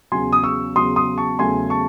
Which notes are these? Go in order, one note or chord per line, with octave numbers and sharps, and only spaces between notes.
E2 C#3 F#3 G#5 C6
D#6
C#6 E6
E2 C#3 F#3 C6 D#6
C6 D#6
A5 C#6
E2 C#3 F#3 A3 G#5 C6
A5 C#6